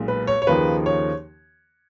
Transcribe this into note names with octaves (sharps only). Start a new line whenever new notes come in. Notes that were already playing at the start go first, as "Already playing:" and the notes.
Already playing: B1 A#2 G#3
B4
C#5
C#5
D#2 C#3 F3 A#3 D#4 B4
C#5